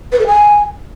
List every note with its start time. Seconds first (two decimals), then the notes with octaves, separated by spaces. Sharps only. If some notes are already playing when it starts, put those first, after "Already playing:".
0.12 B4
0.19 A4
0.27 G#5